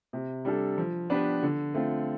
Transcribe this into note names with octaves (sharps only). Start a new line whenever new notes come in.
C3
G3 D4 A4
F3
B3 D4 G4 B4
D3
A3 C4 F4